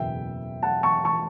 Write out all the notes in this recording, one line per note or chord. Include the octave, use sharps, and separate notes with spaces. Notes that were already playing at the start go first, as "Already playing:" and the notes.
Already playing: F#1 E2 B2 E5 G5
F#5 A5
A5 C#6
A5 C#6